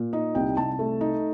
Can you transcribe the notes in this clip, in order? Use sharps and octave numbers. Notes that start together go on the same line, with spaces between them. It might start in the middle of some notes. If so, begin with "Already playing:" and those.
Already playing: A#2
D#4 D#5
C2 G5
C2 A5
A3
D#4